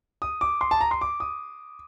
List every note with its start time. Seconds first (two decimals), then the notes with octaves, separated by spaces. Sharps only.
0.22 D#6
0.41 D6
0.61 C6
0.71 A5
0.81 A#5
0.91 C6
1.01 D6
1.20 D#6